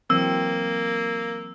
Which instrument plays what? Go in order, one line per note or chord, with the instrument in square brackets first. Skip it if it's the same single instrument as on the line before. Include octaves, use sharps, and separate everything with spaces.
[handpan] E3 F#3 C4 [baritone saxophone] A#3 [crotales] E6